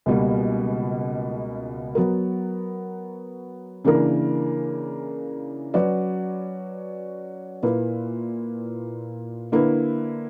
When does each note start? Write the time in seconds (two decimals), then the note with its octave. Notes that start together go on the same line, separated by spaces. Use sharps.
0.06 C#2 B2 G3 A#3
1.95 F#3 B3 F#4 A#4
3.85 C#3 E3 A#3 D4 A#4
5.74 F#3 C#4 F#4 B4 D5
7.63 A#2 A#3 E4 B4
9.52 D3 A#3 E4 B4